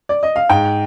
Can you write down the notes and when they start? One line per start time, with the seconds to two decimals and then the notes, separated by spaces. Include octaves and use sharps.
0.09 D5
0.23 D#5
0.36 F5
0.50 G#2 G5